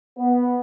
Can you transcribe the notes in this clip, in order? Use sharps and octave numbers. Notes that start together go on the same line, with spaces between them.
B3